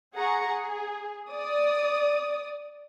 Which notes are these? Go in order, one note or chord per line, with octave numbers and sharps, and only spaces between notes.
G#4 F#5 A#5 C#6
G#4
D5 D#6